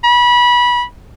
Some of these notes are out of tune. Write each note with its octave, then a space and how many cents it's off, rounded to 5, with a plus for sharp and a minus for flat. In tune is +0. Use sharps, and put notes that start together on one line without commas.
B5 -25